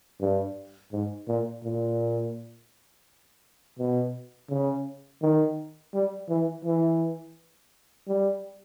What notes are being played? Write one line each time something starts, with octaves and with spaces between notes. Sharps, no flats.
G2
G#2
A#2
A#2
B2
C#3
D#3
G3
E3
E3
G3